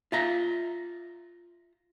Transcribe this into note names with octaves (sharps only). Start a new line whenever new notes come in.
F4 E5 A#5